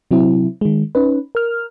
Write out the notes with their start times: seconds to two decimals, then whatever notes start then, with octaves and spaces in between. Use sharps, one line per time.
0.11 C3 F#3 C4 E4
0.61 D#3 G#3
0.95 C#4 D#4 B4
1.35 A#4 F6